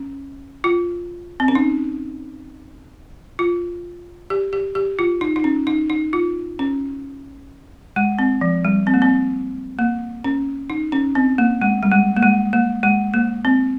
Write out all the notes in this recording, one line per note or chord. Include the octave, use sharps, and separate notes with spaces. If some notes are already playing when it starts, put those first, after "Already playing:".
Already playing: C#4
F4
C4
C#4
D#4
F4
G4
G4
G4
F4
D#4
D#4
C#4
D#4
D#4
F4
C#4
G#3
C4
F3
G3
C4
A#3
C4
A#3
C#4
D#4
C#4
C4
A#3
G#3
G3
G#3
A#3
G#3
A#3
G#3
A#3
C4